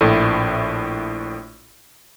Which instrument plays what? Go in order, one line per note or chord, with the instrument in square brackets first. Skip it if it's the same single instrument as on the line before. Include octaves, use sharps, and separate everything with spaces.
[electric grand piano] A#1 A2 A3